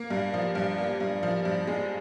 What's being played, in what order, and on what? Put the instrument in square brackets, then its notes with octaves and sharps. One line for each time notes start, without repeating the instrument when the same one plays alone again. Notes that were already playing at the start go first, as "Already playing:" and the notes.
Already playing: [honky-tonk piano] A#3
G2
F3
G2
A#3
G2
F3
G2
G#3